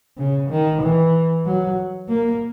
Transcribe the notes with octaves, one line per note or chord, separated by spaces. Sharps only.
C#3
D#3
E3
F#3
A#3